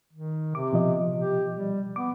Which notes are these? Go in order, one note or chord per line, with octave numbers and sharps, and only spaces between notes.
D#3
C3 D6
B2 F3 D#5
G4
G3
B3 D6